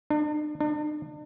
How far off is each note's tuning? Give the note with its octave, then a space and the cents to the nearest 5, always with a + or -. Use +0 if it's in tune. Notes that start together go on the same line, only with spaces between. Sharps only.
D4 +40
D4 +40